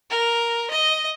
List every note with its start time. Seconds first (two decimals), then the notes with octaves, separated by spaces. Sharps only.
0.10 A#4
0.71 D#5